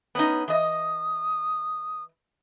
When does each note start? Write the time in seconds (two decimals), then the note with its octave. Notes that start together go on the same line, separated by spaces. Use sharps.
0.15 B3 C#4 D#4
0.48 E3 D#5 D#6